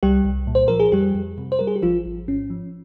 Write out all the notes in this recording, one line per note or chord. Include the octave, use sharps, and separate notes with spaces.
C2 G3 G4
C2
A#2
C5
F3 A#4
G#4
F2 G3 G4
F2
C3
C5
G3 A#4
G#4
G4
G#1 F3 F4
G#1
G#2 C#4
F3